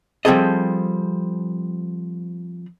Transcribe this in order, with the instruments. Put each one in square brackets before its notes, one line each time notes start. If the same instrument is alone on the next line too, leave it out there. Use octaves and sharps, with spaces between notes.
[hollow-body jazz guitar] F3 G3 C4 G#4 A4 D#5